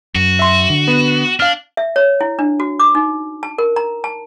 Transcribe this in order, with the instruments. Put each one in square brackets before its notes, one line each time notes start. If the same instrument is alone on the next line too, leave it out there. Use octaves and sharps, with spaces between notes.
[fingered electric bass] F#2 [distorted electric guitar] F#4
[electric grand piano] E5 C6
[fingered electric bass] D3
[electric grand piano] B3
[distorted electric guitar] D4 [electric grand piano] F5 F6
[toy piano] E5
C#5
E4
D4
F#4
D6
D#4
A5
A#4
A#5
A5